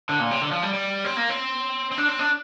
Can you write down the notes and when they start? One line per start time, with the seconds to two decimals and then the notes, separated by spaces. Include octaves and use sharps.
0.09 D3
0.20 A#2
0.31 C3
0.41 D3
0.52 F3
0.63 G3
0.73 G3
1.05 C4
1.17 A#3
1.29 C4
1.92 C4
1.98 D4
2.08 C4
2.19 D4